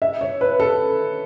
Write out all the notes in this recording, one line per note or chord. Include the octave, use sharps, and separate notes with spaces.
E5
C#5
B4
A4